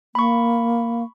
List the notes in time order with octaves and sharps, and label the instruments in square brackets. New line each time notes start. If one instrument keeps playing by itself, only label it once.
[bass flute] A#3 [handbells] B5 C#6